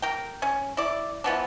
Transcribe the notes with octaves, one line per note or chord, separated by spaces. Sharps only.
A#4 G5
C#4
E4 D5
E3 F3 B3 D4